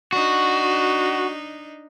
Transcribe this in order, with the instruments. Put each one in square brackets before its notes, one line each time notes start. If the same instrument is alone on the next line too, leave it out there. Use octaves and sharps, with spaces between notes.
[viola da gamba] D4 D#4 [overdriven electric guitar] F#4